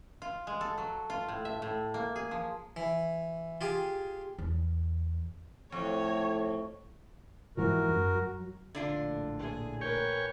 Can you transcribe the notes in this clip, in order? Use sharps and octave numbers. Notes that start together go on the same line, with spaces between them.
F4
G#3
A4
F#3
F4
A2
E5
A2
A#3
G#4
F3
E3
F4 G4 G#4
E2
F2 A2 C#5 C#6
G#2 E3 F3 F#4 A#4
F#2
F#3
A#1 A2 D3 D4 F4
G#4 G#5
A#4 B4 C#5 G5 G#5